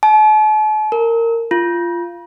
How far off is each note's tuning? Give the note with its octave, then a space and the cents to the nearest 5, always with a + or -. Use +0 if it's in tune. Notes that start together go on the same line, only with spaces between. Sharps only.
A5 -45
A#4 -20
F4 -15